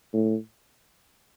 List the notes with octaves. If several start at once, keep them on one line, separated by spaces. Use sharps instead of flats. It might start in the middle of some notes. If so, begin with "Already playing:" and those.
A2